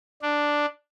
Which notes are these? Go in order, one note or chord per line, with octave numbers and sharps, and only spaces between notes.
D4